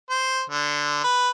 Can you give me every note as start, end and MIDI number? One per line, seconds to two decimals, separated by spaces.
0.10 0.42 72
0.50 1.02 50
1.04 1.29 71